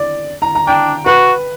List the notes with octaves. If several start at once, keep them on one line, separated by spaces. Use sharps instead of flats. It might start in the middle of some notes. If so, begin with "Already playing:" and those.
Already playing: D5
A#5
A#5
D4 G5
F#4 B4